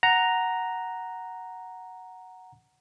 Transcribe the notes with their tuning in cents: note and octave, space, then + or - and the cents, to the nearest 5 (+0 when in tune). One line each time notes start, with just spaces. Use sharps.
F#5 +0 A#5 +0